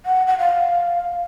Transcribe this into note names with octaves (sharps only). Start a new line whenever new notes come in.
F#5
F#5
F5